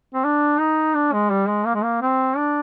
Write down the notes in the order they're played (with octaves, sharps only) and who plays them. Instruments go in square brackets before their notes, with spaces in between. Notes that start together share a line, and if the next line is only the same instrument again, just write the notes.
[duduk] C4
D4
D#4
D4
G#3
G3
G#3
A#3
G#3
A#3
C4
D4